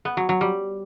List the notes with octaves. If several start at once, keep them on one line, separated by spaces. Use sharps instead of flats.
B3
F#3
F#3
G3